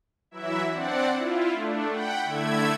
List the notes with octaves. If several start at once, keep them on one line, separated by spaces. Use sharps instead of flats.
E3 F#3 E4 E5
C4 D4 D5 F#5
E4 F4
A3 D4
F#5 G5 B5
D3 A3 E4 E5 G#6